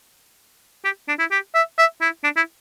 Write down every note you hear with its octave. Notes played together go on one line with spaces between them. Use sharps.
G4
D4
E4
G4
E5
E5
E4
D4
E4